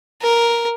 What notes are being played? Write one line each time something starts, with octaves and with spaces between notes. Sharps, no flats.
A#4